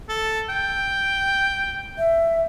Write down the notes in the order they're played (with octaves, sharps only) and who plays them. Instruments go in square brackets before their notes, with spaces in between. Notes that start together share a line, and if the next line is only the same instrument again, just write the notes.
[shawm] A4
G5
[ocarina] E5